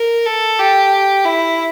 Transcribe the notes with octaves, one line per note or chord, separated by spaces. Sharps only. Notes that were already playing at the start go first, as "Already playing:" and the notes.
Already playing: A#4
A4
G4
E4